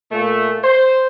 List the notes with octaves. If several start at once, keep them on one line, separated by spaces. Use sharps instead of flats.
A#2 A3
C5